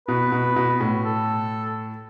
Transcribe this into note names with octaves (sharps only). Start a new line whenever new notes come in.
B2 B4
B2
B2
A2
A4